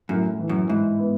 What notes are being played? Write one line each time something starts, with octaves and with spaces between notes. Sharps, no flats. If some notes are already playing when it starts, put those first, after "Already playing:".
F#2 A2
E3
F#2
G#2 E4
B3